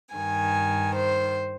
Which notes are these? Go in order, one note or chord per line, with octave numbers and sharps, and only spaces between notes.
G2 D#3 G#5
C5